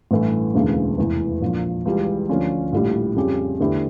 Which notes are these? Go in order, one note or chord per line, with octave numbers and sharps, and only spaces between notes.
A1 G2 E3 A3
E1 D2 C#3 E3 A#3
F1 E2 E3
A#1 A#2 F3
C#2 C#3 E3 G3
D2 D3 F3 C#4 F4
A#1 A2 G3
F2 C#3 G3 C#4 G4
E2 D3 A3 E4 G4